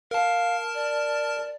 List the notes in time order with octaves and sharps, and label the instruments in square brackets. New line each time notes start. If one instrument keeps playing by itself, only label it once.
[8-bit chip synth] A#4 A5 [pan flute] F5
[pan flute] D5